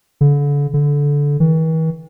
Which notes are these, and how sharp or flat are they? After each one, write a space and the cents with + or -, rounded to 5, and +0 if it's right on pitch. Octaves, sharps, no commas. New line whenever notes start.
D3 -35
D3 -20
E3 -45